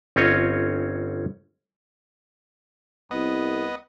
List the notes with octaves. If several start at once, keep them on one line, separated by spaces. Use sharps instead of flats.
G1 C4 C#4 F4 C#5 D#5
C2 B3 D#5